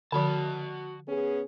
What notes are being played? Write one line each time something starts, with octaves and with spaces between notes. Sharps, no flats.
D3 F3 F#4 A5
B3 C#4 G#4